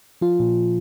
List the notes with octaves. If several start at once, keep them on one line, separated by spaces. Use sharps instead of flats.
F3 F4
A#2